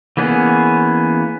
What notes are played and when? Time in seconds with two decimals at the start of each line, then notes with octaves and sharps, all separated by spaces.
0.17 E3 A#3 B3 C#4 G#4